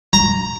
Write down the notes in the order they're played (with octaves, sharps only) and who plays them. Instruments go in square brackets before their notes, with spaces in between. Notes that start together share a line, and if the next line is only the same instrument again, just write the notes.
[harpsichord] A#5